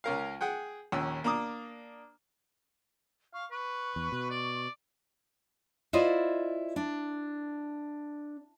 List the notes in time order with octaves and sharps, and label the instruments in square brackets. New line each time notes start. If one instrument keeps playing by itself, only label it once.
[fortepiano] C#2 C#4 A#4 F5
G#4 F#5 G5
A#1 D#2 C#4 E6
A#3 D4 A#5 D6 D#6
[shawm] F5 [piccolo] C#6
[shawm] B4 [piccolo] C#6
[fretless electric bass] E2
B2
[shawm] D5
[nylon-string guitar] E4 F4 C5 D5 D#5
D4